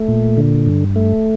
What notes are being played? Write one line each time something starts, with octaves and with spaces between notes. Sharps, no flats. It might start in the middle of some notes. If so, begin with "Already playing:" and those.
Already playing: A3
A#2
D3
G2
A3